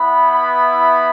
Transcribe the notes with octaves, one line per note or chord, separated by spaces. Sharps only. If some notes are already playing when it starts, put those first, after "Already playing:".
Already playing: B3 E4 B5
B5